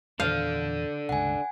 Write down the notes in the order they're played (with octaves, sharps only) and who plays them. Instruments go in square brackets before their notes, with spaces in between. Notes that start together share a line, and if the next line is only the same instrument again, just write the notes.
[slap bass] E2 A#2 D#3 [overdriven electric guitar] D4 A4 [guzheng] F5 [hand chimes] G6
[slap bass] C#2 G2 C3 [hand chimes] F#5 G#5